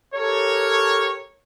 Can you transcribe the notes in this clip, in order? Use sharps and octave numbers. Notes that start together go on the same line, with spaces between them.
G4 A4 A#4 C#5